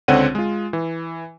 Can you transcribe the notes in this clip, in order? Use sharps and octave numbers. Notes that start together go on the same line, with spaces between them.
C#2 D3 C4 C#5 F#5 D#7
G#3 F4
E3